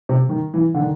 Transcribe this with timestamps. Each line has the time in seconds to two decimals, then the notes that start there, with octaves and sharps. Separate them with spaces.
0.09 C3
0.29 D#3
0.54 E3
0.74 D3
0.80 D#3